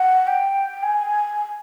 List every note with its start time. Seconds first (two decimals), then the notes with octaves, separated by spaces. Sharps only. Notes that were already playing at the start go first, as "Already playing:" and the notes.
Already playing: F#5
0.27 G5
0.83 G#5